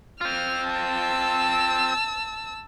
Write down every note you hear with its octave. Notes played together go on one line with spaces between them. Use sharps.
C4 F4 F6
A5 E6